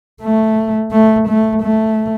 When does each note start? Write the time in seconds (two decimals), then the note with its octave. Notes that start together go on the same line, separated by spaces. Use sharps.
0.22 A3
0.92 A3
1.28 A3
1.63 A3